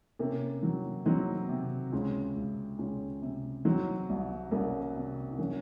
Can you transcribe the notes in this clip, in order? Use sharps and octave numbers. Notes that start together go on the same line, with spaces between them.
C3 A#3 C#4
F#3
F#3 C4 D#4
C3
C#2 C#4 F4
C#2
C#2 C#4 F4
C3
F#3 C4 D#4
C2
C2 A#3 C#4
C3
D#4
F#3 A#3 C#4